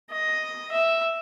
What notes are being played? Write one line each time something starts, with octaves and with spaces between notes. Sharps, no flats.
D#5
E5